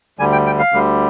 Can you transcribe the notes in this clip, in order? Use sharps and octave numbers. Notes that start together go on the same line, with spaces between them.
D2 D3 G3 G#5
G5
G5
F5
D2 D3 G3